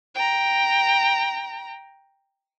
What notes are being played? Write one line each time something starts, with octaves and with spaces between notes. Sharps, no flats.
G5 A#5